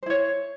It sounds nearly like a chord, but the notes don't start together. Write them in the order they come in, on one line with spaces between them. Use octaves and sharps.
C5 E4 C#5